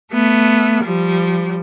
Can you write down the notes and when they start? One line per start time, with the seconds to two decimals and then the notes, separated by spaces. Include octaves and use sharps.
0.11 A3 B3
0.84 F3 G3